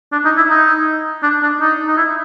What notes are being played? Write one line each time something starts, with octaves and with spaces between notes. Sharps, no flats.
D4
D#4
E4
D#4
D4
D4
D#4
D#4
E4